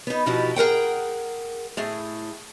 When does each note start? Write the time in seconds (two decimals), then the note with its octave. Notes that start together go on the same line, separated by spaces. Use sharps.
0.07 B3 D#4
0.26 B2 F3 D#4 E4 F#4 G4
0.56 G#4 A#4 F#5 G5
1.77 A2 A3 G#4